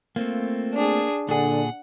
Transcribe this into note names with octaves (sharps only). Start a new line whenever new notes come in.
A3 A#3 C4 F4
D4 G#4
A#2 D3 D4 G#4 F#5